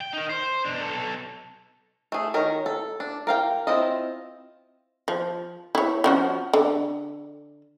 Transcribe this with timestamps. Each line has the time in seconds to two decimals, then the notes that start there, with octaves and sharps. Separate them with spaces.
0.01 G5
0.13 D#4 A#4
0.30 C5
0.65 B2 D4
0.80 B1 A4
2.12 A3 G#4
2.34 D#3 A#4 C#5
2.66 A4
3.00 D4
3.27 A#4 F5 G5
3.67 C4 E4 F4 D#5
5.08 F3
5.75 E4 C#5
6.04 F3 C#4 F#4
6.54 D3